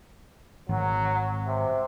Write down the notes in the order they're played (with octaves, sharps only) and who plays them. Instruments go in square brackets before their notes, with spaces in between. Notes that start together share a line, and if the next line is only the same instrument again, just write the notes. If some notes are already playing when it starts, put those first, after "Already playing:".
[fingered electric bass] G#1 [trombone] F#3
[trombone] C3